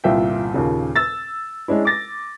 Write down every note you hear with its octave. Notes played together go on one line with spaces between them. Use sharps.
G1 C2 A#2 F4 E5 G5
D#2 A#2 C#3
E6 A6
G#3 C#4 D4 E4
D6 A6 A#6